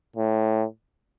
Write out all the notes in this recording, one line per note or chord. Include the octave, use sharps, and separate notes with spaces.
A2